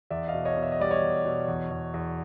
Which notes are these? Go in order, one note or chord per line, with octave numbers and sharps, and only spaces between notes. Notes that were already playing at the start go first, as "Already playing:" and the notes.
E2 D5 E5
D#5 F5
B2
C#5 D#5
B2
E5
D#5
G3 D5
C#5 D#5
E2
B2
E2
E2
E2